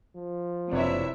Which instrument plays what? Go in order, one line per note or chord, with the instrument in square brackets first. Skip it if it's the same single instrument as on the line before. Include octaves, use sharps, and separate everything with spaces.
[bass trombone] F3
[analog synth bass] F#1 [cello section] C3 E4 E5 [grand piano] D4 B4 C#5